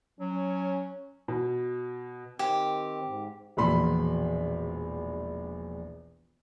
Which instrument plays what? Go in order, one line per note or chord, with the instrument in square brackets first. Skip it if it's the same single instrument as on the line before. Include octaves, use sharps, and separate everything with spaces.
[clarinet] F#3 [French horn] C#4
[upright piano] B2
[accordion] D#3 C4 [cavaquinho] G4
[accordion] G#2
[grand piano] E1 A#1 B5 C6